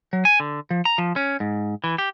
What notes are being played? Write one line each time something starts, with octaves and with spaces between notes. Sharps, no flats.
F#3
G#5
D3
F3
A#5
F3
C#4
G#2
E3
G4